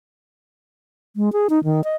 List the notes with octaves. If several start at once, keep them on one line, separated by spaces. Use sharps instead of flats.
G#3
G#4
D#4
D#3
D#5